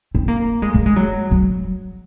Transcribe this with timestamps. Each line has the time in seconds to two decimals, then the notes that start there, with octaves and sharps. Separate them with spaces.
0.15 C4
0.28 A#3
0.62 G#3
0.74 A#3
0.86 G#3
0.96 F#3
1.31 F#3